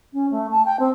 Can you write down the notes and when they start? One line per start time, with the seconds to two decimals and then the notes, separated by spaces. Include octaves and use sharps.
0.13 C#4
0.31 A3
0.51 A5
0.65 G5
0.79 C4